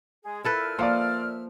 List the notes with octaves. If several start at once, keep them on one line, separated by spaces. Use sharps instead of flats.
G#3 G#4
A#2 E4 A4 B4 E5 F6
F3 A#3 D5 F5 C6